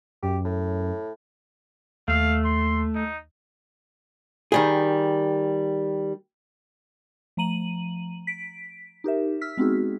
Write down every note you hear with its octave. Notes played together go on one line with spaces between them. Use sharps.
F#2 G4
A2
D#2 A3 F5 E6
C6
D#4
D#3 G3 G#4
F3 A3 A#5 D#7 F#7
B6 D7
D#4 G4 A#4 E5
E6 F6 B6
G#3 B3 C4 D#4 F#4 G#4